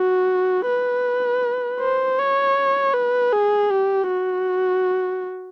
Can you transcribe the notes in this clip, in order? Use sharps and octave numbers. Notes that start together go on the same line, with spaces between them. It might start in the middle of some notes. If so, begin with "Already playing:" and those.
Already playing: F#4
B4
C5
C#5
B4
G#4
G4
F#4